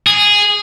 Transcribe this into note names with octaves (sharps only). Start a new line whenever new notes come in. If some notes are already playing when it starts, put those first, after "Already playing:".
G#4